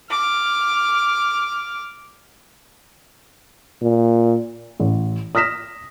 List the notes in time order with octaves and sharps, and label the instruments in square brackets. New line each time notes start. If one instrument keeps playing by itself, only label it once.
[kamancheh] D6 F6
[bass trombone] A#2
[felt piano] A1
D#6 F6 A#6 B6 E7